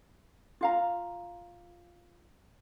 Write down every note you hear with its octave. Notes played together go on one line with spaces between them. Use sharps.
F4 F5 A#5